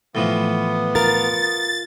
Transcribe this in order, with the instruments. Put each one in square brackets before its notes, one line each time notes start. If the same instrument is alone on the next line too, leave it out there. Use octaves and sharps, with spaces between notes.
[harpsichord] A2 E3 F3 [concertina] B3
[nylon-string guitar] F4 A#4 [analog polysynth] A6